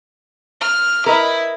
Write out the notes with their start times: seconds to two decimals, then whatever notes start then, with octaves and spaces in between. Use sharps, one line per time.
0.61 F6
1.06 E4 A#4 B4 D#5